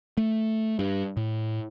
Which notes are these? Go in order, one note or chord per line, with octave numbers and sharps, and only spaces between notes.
A3
G2
A2